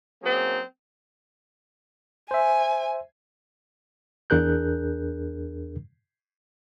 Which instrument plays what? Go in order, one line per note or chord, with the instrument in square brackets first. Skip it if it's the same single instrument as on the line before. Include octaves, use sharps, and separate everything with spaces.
[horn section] F#3 A#3 C4 C#4 D#4 G#4
[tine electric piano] C5 E5 [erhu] G#5
[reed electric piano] E2 D4 G#4 A#4 F#6 G6